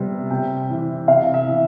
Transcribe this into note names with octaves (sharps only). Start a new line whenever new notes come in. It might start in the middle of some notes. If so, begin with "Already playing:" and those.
Already playing: C3 G3 B3
C3 G5
E3
C3 F5
E5
E3